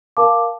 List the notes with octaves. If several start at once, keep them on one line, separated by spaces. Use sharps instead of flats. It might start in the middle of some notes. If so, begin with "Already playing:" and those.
A#4 F5 A5 D6